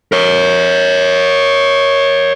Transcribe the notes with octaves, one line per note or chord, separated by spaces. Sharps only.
A#4 C#5